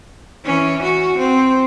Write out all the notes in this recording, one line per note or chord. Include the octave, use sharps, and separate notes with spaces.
E3 C#4
F#4
C4